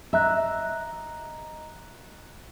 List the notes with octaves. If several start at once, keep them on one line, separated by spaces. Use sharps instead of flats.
D#5 E5 A#5 F#6